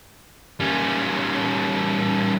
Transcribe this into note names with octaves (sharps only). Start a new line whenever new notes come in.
G3 C#4